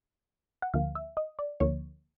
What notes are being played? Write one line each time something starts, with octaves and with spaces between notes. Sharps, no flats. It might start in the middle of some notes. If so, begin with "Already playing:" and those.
F#5
D2 D3 F3 A#3 F5
E5
D#5
D5
D2 D3 F3 A#3 C#5